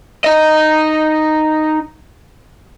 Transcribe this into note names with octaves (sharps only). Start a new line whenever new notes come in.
D#4 D#5